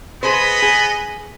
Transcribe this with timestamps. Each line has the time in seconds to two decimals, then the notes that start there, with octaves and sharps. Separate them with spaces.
0.23 B3 G#4 B4 C5 D#5 B5
0.62 G#4